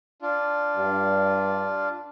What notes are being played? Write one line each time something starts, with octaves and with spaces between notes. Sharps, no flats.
D4 F4
G2